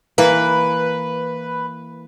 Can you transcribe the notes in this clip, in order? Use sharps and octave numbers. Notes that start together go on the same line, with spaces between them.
E3 A#3 B4